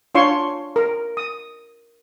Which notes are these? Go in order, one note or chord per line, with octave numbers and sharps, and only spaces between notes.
D4 F4 C#5 F5 C6 C#6
A#4
D#6